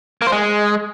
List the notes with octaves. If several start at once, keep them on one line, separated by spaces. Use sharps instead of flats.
A#3
C5
G#3